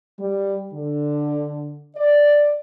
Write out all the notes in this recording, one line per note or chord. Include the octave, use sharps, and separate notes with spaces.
G3
D3
D5